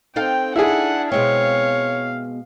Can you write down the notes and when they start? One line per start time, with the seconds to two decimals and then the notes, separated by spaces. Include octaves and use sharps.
0.16 C4 D#4 A4 F5 G5
0.56 D4 E4 G#4 F#5
1.12 B2 G#3 C4 C#5 F5